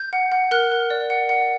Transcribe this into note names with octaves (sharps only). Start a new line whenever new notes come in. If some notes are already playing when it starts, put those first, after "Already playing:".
Already playing: G6
F#5
F#5
A#4 F#6
A#4
D5
F#5
F#5